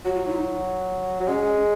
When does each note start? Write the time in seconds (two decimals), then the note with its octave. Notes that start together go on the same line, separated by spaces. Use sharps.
0.05 F#3 F#4
0.15 F4
0.25 F#3 D#4
0.31 F4
0.36 D#4
1.20 F#3
1.28 G#3 C#4